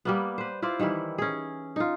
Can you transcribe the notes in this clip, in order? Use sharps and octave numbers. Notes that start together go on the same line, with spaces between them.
G3 A#3 B3
B4 C5
E4 F4 C5 D5
D#3 E3 G3 E4
C#4 G#4
D#4 F4